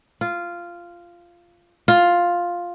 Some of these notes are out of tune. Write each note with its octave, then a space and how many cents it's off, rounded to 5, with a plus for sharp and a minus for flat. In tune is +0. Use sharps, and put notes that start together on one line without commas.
F4 -10
F4 +5